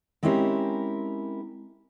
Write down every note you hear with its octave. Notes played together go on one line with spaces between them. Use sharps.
G#3 C4 C#4 E4 G4 A#4